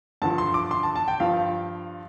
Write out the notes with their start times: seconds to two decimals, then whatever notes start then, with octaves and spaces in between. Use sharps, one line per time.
0.22 G2 D3 F3 A5
0.38 C6
0.54 D6
0.71 C6
0.83 A5
0.96 A5
1.08 G5
1.20 G2 F3 F5